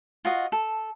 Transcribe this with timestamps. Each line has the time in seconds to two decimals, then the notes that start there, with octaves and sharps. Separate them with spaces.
0.25 F4 F#4 D#5
0.52 A4